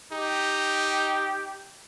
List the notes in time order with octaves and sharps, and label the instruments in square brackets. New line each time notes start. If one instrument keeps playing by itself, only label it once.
[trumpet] D#4 [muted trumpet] G4